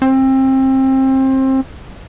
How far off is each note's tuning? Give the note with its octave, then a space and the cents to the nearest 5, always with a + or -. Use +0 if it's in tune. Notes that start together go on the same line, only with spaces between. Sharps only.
C4 +25